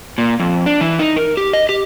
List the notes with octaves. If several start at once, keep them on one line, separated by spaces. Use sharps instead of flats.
A#2
F2
D4
E3
D#4
A#4
G4
D#5
G4